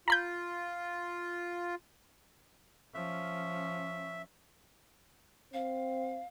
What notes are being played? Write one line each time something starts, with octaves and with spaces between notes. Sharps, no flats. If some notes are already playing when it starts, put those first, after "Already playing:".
F4 A#5 B5 G6
F3 C#4 E5
C4 F5